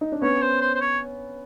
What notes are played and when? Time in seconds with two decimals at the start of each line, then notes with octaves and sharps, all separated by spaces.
0.01 D#4
0.12 D4
0.22 B3 C#4 C#5
0.41 C5
0.61 C5
0.75 C5
0.81 C#5